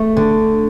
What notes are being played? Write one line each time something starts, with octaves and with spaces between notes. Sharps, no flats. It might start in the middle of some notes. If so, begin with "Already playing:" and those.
Already playing: A3
D3